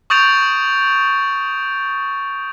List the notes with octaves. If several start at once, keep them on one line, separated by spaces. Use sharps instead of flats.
C#6 D#6 G6 A6 D7 F7